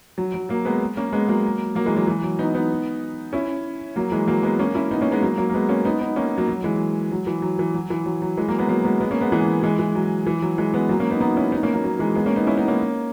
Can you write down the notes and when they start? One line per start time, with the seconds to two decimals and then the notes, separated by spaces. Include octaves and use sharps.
0.18 F#3
0.34 F#3
0.49 F#3 A#3
0.65 G#3 B3
0.97 A#3 C#4
1.13 G#3 B3
1.29 F#3 A#3
1.75 F#3 A#3
1.86 E3 G#3
1.97 F#3
2.07 E3
2.23 F#3
2.39 B3 D#4
2.55 B3 D#4
3.33 C#4 E4
3.96 F#3 A#3
4.12 E3 G#3
4.28 F#3 A#3
4.43 G#3 B3
4.59 A#3 C#4
4.75 C#4 E4
4.91 B3 D#4
5.01 A#3 C#4
5.12 G#3 B3
5.23 F#3 A#3
5.38 F#3 A#3
5.50 A#3
5.54 G#3 B3
5.69 A#3 C#4
5.85 B3 D#4
6.01 B3 D#4
6.16 A#3 C#4
6.38 F#3 A#3
6.48 F#3
6.64 E3 G#3
7.12 F#3
7.27 E3
7.42 F#3
7.59 E3
7.74 F#3
7.90 E3
8.06 F#3
8.22 F#3
8.37 E3 G#3
8.48 F#3 A#3
8.58 G#3 B3
8.68 F#3 A#3
8.84 G#3 B3
9.00 G#3 B3
9.11 A#3 C#4
9.21 G#3 B3
9.32 E3 G#3
9.63 E3 G#3
9.79 E3
9.95 F#3
10.27 E3
10.42 F#3
10.58 E3 G#3
10.74 G#3 B3
10.89 F#3 A#3
11.00 A#3 C#4
11.10 B3 D#4
11.21 B3 D#4
11.36 C#4 E4
11.52 B3 D#4
11.63 A#3 C#4
11.74 F#3 A#3
11.84 F#3
11.99 E3 G#3
12.15 G#3 B3
12.26 A#3 C#4
12.36 B3 D#4
12.47 C#4 E4
12.57 B3 D#4
12.68 A#3 C#4